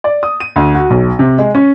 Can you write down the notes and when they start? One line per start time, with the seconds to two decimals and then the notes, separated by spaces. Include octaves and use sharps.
0.04 D5
0.23 D#6
0.40 D#7
0.56 D2
0.75 F#4
0.90 B1
1.19 C3
1.39 G#3
1.55 C#4